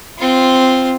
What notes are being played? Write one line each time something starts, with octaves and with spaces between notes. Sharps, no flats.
C4 F4